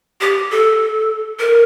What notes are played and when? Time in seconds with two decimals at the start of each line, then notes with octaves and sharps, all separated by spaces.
0.21 G4
0.51 A4
1.39 A#4